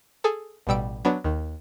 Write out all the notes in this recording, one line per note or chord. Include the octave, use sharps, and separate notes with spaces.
G#4 A4
A1 B2 G3 E6 D7
F#3 B3 D4
D#2 D#3